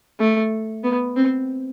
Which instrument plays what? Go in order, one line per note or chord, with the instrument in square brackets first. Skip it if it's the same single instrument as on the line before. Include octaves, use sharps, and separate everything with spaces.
[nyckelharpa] A3
B3
C4